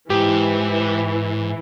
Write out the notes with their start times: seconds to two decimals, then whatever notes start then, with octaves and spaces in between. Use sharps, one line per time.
0.10 G#2 E3 G4